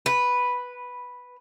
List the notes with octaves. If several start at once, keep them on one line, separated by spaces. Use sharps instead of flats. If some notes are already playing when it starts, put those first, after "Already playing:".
B4